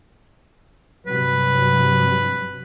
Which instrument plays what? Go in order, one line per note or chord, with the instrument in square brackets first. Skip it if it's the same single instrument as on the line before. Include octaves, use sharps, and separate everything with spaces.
[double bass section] G2 C3 F#3 [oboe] B4